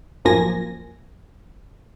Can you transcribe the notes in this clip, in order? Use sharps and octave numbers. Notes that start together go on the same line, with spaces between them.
A1 F#2 F3 A#3 G#5 A#6